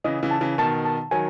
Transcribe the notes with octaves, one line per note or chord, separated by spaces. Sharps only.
C#3 E3 D#5
C#3 E3
A5
C#3 E3
B2 D#3 A5
A5
D#3 F#3 G#5